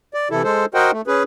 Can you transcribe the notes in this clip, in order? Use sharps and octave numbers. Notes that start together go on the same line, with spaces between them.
D5
C3 E3 E4 A4
G#3 A4 C5
F#4 A#4 C5 D#5 F#5 G5
A3
C#4 G#4 B4